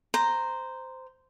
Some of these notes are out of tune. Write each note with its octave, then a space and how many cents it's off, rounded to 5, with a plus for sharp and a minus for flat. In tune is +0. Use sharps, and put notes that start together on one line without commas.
C5 -10 A#5 +0